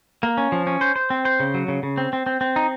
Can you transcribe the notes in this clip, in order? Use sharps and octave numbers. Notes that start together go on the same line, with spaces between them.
A#3
C#4
F3
C#4
C5
C5
C4
C5
C#3
F#3
C#3
C#3
C4
C4
C4
C4
D#4